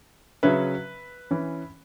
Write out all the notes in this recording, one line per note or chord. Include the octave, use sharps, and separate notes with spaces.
C#3 F#3 C#4 B4 E5
E3 C#4